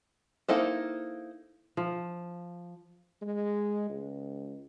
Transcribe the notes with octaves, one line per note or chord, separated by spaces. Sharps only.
A#3 D#4 E4 A4 C5
F3
G#3
C#2